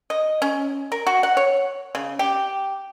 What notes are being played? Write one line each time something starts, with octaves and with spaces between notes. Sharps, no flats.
D#5
C#4
A#4
F#4
F#5
C#5
C#3
G4